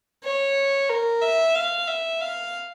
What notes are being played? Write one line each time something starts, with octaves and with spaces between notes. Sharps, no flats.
C#5
A#4
E5
F5
E5
F5